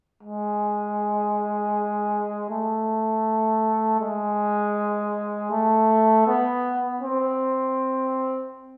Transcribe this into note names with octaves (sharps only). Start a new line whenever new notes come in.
G#3
A3
G#3
A3
B3
C4